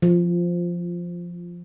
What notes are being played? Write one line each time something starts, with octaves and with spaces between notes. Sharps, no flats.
F3